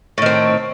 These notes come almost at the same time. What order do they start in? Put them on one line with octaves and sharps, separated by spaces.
A2 D#3 C4